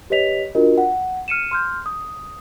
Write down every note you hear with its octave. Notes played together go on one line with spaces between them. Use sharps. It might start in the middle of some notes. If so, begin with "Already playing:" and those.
G4 B4 C#5 D#5 B6 F7
D4 F4 F#4 A#4 D#5
F#5
F6 C#7 D#7 E7
C6 F6 G6
D#6